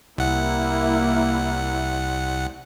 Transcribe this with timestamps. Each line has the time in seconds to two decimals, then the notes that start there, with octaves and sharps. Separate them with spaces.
0.18 C2 A#3 E4 F#5